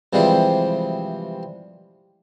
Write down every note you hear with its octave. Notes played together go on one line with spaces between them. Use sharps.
C3 E3 F3 G3 G#3 C4